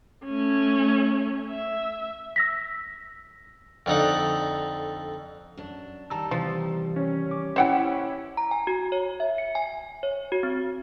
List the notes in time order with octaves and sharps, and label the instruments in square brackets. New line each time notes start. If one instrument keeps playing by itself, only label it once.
[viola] A3 C#4
E5
[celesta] E6 A#6 B6
[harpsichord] F2 D3 D#4 F#5
[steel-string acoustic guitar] F#2 D4
[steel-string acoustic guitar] D#3 G3 G4 [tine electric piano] A5 A#5 E6
[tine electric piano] C3 E3 [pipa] F3
[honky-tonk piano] C#4
[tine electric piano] D6
[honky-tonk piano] C#4 E4 [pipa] C5 F#5 G5
[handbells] A#5
G#5
F#4
C#5
E5
C#7
G#5
C#5
F#4
C4